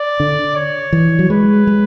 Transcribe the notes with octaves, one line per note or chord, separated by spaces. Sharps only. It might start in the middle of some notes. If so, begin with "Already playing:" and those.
Already playing: D5
D3
C#5
E3
F#3
G#3 B4
G#3